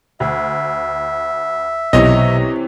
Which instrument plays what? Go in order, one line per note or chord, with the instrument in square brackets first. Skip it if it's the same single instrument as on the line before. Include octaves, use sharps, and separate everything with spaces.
[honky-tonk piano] D2 [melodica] E5
[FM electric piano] B1 A#5 [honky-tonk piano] C3 E3 C#5 [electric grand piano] D#5